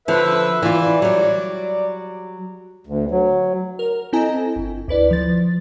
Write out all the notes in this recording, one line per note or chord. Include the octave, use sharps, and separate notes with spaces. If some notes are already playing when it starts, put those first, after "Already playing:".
D3 F3 B4 E5
E3 F4 D5
F#3 G3
D2
F#3
A#4
C4 E4 A4 D#5 G#5 A#5
G1
D2 E4 B4 D5
F3 A6